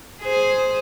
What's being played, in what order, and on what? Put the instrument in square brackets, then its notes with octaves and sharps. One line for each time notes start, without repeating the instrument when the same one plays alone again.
[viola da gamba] G#4 C5